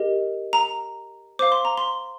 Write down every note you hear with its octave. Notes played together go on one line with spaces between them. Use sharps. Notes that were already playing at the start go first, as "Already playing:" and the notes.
Already playing: G4 A#4 D#5
A#5
C5 F5 D6
C6
A#5
C6